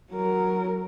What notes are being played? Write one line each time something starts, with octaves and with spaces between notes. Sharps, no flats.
F#3 A#4